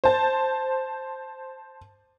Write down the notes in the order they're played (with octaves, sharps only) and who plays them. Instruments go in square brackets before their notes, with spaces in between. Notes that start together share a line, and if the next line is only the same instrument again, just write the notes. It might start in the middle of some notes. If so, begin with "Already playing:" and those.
[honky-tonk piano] C5 A5